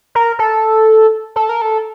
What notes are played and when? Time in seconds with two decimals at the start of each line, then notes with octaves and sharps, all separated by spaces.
0.15 A#4
0.39 A4
1.36 A4
1.49 A#4
1.62 A4